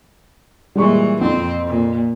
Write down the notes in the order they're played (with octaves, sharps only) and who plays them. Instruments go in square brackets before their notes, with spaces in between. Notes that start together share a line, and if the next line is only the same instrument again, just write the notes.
[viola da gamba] A#2 E3 [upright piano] G3 G#3 C#6
[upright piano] F2 [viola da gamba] C4
[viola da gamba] A#2